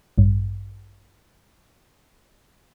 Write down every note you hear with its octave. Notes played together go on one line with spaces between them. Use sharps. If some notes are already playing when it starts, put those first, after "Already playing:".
A1 G2